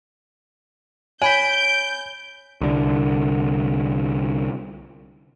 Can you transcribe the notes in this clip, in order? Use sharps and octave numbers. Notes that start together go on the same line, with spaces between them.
C#5 G#5 B5 G6 B6 D7
C2 D3